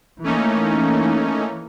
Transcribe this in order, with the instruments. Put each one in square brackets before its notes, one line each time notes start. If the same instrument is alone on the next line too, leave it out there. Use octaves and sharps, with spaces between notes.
[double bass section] E3 A#3 [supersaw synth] A3 C#4 D#4